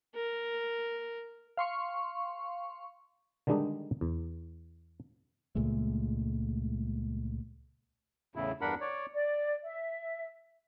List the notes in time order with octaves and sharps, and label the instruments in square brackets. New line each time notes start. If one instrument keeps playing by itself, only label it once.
[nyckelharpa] A#4
[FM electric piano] F5 C6 C#6
[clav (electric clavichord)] D3 D#3 G3 G#3 D4 D#4
E2
[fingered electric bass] C#2 A#2 G#3 A3
[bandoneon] E2 A2 C#3 E4
E2 G2 D4 A#4 F#5 B5
C#5 D5
[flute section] D5
E5